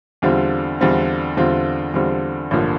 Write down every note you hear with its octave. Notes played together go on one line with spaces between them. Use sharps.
E2 D3 G3 C4 F4
E2 D3 G3 C4 F4
E2 D3 G3 C4 F4
E2 D3 G3 C4 F4
A1 G2 D3 F3 A#3